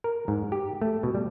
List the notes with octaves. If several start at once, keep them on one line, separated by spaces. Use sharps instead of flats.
A#4
G#2
G4
A3
B2
G3